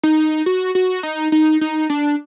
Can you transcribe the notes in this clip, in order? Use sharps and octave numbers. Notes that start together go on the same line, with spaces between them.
D#4
F#4
F#4
D#4
D#4
D#4
D4